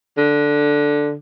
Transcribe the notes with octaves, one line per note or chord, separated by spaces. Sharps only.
D3